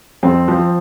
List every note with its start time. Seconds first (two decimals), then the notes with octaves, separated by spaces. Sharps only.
0.23 F2 C4
0.48 F3